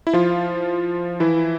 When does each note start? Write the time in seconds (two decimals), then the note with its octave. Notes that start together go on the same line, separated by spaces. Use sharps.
0.07 E4
0.13 F3 F4
1.20 E3 E4